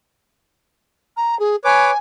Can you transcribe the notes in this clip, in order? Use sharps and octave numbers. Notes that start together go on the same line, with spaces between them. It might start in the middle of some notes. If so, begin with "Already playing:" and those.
A#5
G#4
B4 C#5 G#5 D6